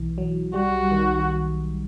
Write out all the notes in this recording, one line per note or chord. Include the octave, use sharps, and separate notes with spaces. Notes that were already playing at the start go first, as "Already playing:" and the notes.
Already playing: B1 E3
F#3
G3 F#4
D#3